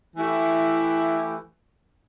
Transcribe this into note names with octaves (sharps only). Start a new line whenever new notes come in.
E3 A3 E4 G4